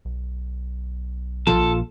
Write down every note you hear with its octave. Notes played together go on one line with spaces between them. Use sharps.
B1
A#1 A#2 F3 F4 A4